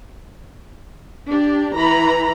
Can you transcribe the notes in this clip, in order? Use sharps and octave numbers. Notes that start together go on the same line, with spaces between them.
D4 G4
E3 A#5 B5